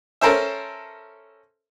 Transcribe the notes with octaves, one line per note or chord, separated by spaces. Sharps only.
C#4 A4 A#4 C5 E5